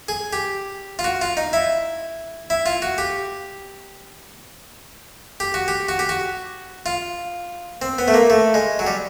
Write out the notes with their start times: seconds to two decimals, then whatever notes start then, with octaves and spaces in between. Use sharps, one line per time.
0.09 G#4
0.33 G4
0.99 F4
1.04 F#4
1.21 F4
1.37 D#4
1.53 E4
2.50 E4
2.66 F4
2.82 F#4
2.98 G4
5.40 G4
5.54 F#4
5.68 G4
5.89 F#4
5.99 G4
6.09 F#4
6.86 F4
7.82 C4
7.99 B3
8.08 A3
8.14 A#3
8.30 A3
8.54 G#3
8.79 F#3
8.87 G3